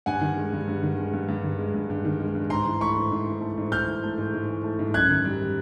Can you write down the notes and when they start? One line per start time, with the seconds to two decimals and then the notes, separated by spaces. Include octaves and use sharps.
0.06 G2 F#5 G#5
0.21 D#3
0.37 G#3
0.52 G2
0.67 G2
0.83 D#3
0.98 G#3
1.13 G2
1.28 G2
1.44 D#3
1.58 G#3
1.74 G2
1.90 G2
2.05 D#3
2.20 G#3
2.35 G2
2.50 G#2 A#5 C6
2.65 E3
2.81 A3 B5 C#6
2.96 G#2
3.12 G#2
3.27 E3
3.41 A3
3.58 G#2
3.72 G#2 F6 G6
3.87 E3
4.03 A3
4.18 G#2
4.34 G#2
4.49 E3
4.64 A3
4.79 G#2
4.94 F#2 F#6 G#6
5.09 D#3
5.25 G3